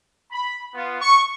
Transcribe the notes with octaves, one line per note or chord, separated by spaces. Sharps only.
B5
B3 F4
C#6